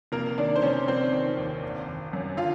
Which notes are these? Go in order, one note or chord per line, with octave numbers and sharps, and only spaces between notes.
F1 A#3 A#4
D#3 D4 D5
C5
F1 C#4 C#5
F1 C4 C5
D#3
D#2
G#1
G#1
F#2
D3 F4 F5